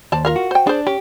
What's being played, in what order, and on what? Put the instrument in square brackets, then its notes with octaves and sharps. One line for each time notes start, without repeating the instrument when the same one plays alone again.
[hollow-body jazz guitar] D#2 [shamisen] C5 D5 A5
[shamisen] F4 A#4 F5
[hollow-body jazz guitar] F#4
[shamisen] C5 G5
[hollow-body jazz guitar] D4 [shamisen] G#4 C5
[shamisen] C#4 [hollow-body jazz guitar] G4